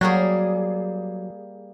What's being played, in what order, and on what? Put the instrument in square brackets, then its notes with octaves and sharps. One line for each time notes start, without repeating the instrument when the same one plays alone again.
[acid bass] F#3 [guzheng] G3 A#3 G#4